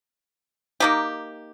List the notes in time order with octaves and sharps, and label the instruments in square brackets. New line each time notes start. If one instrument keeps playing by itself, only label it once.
[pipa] A#3 D#4 G4